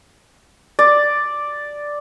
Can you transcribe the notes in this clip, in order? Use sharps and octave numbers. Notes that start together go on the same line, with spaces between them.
D5